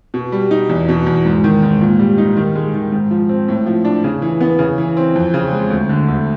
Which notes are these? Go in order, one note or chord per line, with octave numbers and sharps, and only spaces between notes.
B2
G3
D#4
E2
B2
E2
G#2
D#3
G#2
A#2
G3
D#4
D#3
G#3
D#3
G#2
F3
C4
A2
F3
D4
C#3
E3
B3
C#3
E3
C4
F2
C#3
G#3
D2
D3
D2